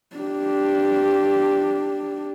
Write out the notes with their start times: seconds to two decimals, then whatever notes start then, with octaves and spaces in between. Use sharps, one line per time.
0.16 D4 G4